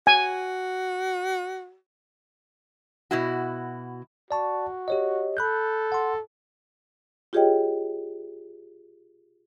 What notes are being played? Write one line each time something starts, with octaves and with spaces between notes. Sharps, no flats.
F#4 G#5
B2 E4 F#4
F#4 D5 A5 C#6
G4 C#5 D#5
A4 B5 F#6 G6
F#5 C6
F4 G4 G#4 C#5 D#5 G5